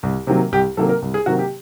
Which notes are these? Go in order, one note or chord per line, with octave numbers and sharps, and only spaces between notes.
C2
C3 D#3 F#3 A#3
C2 G4
C3 D#3 F#3 A#3 A4
A#4
C2
G#4
C3 D#3 F#3 A#3 F#4
G4